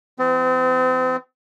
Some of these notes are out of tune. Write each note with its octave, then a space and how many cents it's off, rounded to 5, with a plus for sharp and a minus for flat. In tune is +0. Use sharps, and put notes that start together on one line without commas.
E3 +40 C4 -35